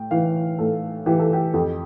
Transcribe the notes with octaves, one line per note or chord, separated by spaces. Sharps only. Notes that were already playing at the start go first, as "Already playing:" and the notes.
Already playing: A2 G5
E3 F5
A2 A4
E3 G4
A4
G4
F2 G4